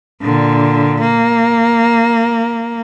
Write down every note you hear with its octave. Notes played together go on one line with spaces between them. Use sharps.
A#2 D3
A#3